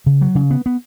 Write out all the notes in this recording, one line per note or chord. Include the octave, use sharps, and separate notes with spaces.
C#3
F#3
C#3
B3
B3